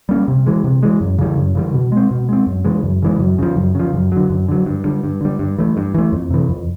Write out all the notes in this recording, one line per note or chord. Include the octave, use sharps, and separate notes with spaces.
G3 A#3 C#4
C3
E3 G#3
C3
E3 G#3
F#2
C#3 E3 G3
F#2
C#3 E3 G3
B2
G#3 C4
B2
G#3 C4
F#2
C#3 E3 G#3
F#2
C#3 E3 G#3
F#2
C#3 F3
F#2
C#3 F3
F#2
D3 F#3
F#2
D3 F#3
G2
D3 G3
G2
D3 G3
G2
E3 A3
G2
E3 A3
F2
C3 E3
F2